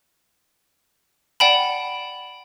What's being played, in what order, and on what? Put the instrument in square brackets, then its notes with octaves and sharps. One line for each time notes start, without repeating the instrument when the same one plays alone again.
[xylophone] D5 F#5 G5 A5 B5